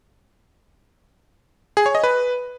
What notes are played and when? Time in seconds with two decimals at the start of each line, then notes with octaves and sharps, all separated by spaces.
1.77 G#4
1.86 C#5
1.95 D#5
2.04 B4